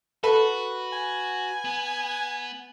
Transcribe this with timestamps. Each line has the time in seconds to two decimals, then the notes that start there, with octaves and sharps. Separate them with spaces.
0.23 F#4 A4 B4
0.93 G#5
1.65 B3